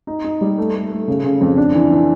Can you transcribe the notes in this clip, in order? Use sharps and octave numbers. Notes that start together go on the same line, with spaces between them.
D#4
D#4
G3
A3
A3
A3
C#3
C#3
F2
D4
E3
E3